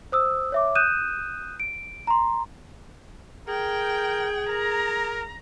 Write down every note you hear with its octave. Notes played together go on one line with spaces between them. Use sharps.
C5 D#6 E6
C#5 E5 D6
D#6 F#6 G6 D#7 E7
D7
A#5 C6
G#4 A#4 G5
A#4 A#5